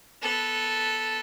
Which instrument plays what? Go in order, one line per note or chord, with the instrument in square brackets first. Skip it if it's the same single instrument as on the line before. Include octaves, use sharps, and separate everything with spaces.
[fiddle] B3 A4